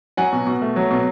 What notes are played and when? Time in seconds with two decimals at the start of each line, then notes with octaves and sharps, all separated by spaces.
0.17 F#3 F#5 G#5
0.33 B2
0.47 B2
0.62 A3
0.76 F#3
0.91 B2